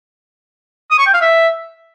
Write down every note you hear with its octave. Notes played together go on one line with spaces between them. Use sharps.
D#6
C#6
G5
F5
E5